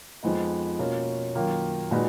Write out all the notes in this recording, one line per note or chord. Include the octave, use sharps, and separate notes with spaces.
F2 F3 G#3 B3 D#4
B2 A#3 C#4 F4
F#2 D#3 A#3 F4
A#2 G#3 D#4 F#4 B4